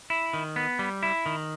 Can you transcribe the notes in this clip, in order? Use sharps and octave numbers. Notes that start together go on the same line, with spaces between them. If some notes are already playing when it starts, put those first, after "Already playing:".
E4
D#3
B3
G3
E4
D#3